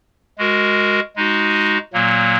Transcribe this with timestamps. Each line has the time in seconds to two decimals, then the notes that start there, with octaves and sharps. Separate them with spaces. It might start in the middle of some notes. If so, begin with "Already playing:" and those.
0.38 G#3 F#4 A#4
1.16 G#3 D#4 F#4
1.93 A#2 F#3 A#3